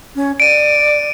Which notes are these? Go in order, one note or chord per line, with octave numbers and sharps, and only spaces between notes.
C#4
D5 D7 D#7